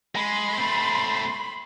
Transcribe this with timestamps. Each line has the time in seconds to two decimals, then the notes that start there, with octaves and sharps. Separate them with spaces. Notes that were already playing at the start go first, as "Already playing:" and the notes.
0.15 G#3 B5 C6
0.57 A3 C4